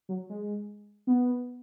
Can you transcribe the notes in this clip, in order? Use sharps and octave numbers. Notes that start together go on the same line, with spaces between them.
F#3
G#3
B3